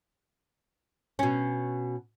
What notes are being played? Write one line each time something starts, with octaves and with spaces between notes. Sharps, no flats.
B2 C#4